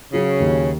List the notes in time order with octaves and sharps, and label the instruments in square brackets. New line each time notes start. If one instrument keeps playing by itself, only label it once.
[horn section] C#3 [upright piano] F#3
[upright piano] D#2